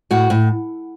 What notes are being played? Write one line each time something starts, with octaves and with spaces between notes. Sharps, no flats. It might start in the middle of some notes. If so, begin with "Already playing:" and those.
A2 F#4
A2